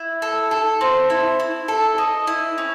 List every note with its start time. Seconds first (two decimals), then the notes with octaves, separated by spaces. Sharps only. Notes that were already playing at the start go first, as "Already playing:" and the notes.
Already playing: E4
0.22 A4
0.51 A4
0.81 C4
1.10 E4
1.40 E4
1.68 A4
1.98 D#5
2.27 E4
2.58 C#4